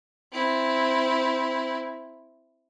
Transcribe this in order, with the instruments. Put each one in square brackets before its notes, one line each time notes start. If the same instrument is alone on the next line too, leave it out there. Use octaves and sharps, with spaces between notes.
[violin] C4 E4